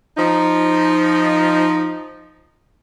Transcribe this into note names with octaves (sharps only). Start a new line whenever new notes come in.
F3 D#4